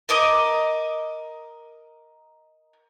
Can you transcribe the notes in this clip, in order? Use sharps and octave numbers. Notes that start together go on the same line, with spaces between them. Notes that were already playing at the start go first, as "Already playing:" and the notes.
A#4 D#5 D6